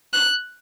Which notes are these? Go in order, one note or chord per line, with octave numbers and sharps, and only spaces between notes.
F#6